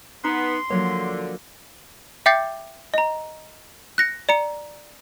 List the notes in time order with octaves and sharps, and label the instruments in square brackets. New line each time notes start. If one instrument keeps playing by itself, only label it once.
[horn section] B3 [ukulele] D#4 [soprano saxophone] C6
[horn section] D3 [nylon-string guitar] F3 F#3 A#3 [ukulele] C#5
[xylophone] E5 G5 D6 G6 A6 C7
D#5 A#5
F#6 A#6 C#7
D5 A#5 C#7